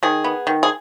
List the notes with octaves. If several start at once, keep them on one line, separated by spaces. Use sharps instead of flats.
D#3 G#4
B3
D#3
G#4